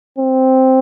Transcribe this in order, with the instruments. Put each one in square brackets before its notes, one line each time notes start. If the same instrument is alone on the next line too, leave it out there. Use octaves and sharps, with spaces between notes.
[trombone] C4